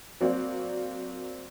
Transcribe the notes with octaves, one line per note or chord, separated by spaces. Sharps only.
F#3 A#3 C4 F#4 D5